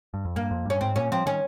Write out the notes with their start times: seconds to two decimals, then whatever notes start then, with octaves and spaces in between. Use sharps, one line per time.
0.14 G2
0.25 F2
0.36 G2 A#3
0.51 F2
0.65 G2 C#4
0.81 G#2 C4
0.96 A#2 C#4
1.12 F3 C4
1.26 D#3 C#4